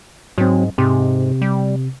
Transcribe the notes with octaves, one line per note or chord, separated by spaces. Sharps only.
G#2 F#3 C4
G#2 C3
G3